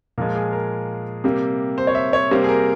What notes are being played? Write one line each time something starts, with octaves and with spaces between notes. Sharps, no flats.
A#2 F3 G#3 A#4
G#4
A#4
C3 G3 A#3
C5
C#5
E5
C#5
C3 G3 A#3 C5
G#4
A#4